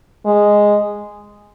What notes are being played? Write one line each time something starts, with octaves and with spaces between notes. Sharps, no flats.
G#3